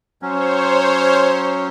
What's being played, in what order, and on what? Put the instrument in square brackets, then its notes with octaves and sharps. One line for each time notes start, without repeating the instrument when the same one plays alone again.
[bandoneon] F#3 C#4 [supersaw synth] C5 C#5